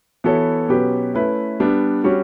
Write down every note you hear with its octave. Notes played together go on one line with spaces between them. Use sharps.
E3 B3 F#4 A4 C#5
B2 F#3 C#4 G4 B4
A3 C#4 E4 B4
G3 B3 D4
G3 C#4 F#4